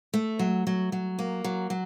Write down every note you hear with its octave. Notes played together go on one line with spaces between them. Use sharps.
A3
F#3
F#3
F#3
A#3
F#3
F#3